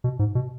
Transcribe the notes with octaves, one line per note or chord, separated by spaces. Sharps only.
B2
G#2
B2